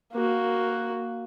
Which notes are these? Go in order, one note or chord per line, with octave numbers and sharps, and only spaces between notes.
A#3 F#4